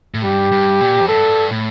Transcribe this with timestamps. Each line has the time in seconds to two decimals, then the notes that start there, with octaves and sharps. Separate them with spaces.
0.14 A2
0.24 G2 G4
0.52 G2
0.81 A#2
1.00 F2
1.08 G2 A4
1.51 A2